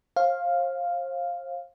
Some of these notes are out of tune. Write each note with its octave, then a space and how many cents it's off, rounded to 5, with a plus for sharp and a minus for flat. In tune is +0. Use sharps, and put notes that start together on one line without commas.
C5 +40 F5 +0